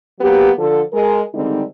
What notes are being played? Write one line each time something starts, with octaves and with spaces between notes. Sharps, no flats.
F#3 A#3 B3 G4
D3 F3 A4
G#3 A#4
D3 D#3 G3 G#3 C4 D#4